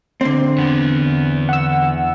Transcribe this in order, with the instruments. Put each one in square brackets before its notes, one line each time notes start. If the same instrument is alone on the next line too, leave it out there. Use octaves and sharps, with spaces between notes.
[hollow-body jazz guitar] D3 C4
[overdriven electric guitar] E2 B3
[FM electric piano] F#5 E6